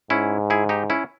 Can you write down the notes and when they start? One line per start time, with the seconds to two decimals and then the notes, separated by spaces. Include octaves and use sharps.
0.10 G#2 C#4 E4
0.50 E4 G#4
0.69 D#4 G4
0.90 C#4 E4